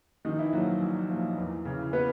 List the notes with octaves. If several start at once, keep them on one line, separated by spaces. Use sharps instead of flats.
A#1 D#3 D#4
E3 E4
A#2 F3 F#3 F#4
A#1
A#2 F3
E2
C#3 E3
B3 B4